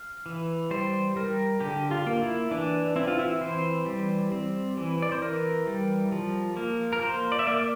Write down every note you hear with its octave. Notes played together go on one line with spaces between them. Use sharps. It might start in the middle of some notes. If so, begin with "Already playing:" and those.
Already playing: F5
E3
G3 C5
G3 A#4
D3 G4
F4
A#3
E4
E3 D4
C4 E4
F4
E4
E3 C5
G3
C4
E3
D5
C5
E3 A#4
G3
F3
A#3
A#4
A#3 C5
D5
E5
A#3 D5